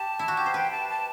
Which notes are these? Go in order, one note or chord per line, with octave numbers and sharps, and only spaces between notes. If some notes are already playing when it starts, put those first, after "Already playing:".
Already playing: G4 A5
E4
F#4
G4
C5
B4 G5
A5
A5